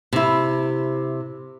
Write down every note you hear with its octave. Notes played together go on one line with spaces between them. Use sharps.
C3 E4